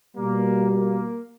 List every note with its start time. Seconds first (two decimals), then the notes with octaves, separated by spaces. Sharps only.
0.16 B2 G3 A#3
0.70 A#3